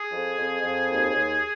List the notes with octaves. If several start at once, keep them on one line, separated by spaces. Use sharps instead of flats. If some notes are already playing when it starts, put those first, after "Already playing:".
Already playing: G#4
F2
F2
F2
D#2
D#2